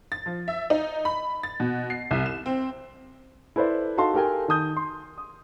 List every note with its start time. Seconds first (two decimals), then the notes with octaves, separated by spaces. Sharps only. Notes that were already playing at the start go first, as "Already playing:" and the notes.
0.12 A6
0.26 F3
0.48 E5
0.70 D#4
1.05 B5
1.43 A6
1.60 B2
1.90 C7
2.11 C2
2.26 E7
2.46 C4
3.56 E4 A4 B4 C5 D5 E5
3.97 D#4 F#4 A4 F5 A5 C6
4.14 G4 A4 A#4 G5 G#5
4.48 D#3 A5 D#6 G6
4.77 C6
5.18 D#6